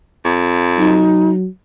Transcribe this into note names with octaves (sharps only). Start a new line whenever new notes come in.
F2
F#3 D#4